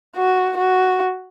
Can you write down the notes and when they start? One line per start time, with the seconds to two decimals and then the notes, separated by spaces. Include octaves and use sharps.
0.16 F#4
0.57 F#4